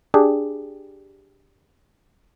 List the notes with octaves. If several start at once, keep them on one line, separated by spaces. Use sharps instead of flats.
D4 G4 G#4